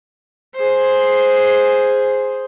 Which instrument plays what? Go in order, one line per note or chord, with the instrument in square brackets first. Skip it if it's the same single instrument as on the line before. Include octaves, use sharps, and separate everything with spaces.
[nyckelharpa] G#4 C5